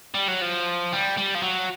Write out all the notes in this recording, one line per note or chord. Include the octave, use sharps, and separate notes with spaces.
G3
F#3
F3
G3
G3
F3
F#3